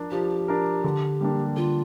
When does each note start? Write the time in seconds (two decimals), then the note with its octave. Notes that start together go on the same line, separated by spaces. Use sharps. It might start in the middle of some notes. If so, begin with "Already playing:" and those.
Already playing: F3 D4 A#4
0.11 F3 G4
0.48 D4 A#4
0.84 D3
1.21 G3 A#3 D4
1.57 D3 F4